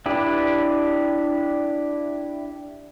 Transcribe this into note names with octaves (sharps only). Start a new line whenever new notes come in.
D4 E4 G4 B4